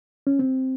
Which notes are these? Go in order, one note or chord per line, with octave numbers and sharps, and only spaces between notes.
C#4
C4